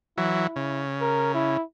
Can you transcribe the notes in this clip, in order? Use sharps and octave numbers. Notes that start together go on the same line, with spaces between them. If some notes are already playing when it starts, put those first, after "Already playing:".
E3 F#3 E4
C#3
A#4
E4